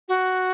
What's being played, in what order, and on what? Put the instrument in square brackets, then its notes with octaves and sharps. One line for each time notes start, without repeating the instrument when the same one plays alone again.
[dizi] F#4